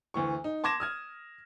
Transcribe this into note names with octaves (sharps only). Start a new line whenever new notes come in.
D2 E3 C#6
D#4
A5 C6 D6 G#6 A#6 E7
D#6 F6 G#6